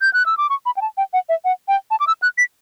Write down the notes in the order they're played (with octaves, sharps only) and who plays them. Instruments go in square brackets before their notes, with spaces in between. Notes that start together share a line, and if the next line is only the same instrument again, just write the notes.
[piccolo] G6
F#6
E6
D6
C#6
B5
G5
A5
G5
F#5
E5
F#5
G5
A5
D6
E6
F#6
B6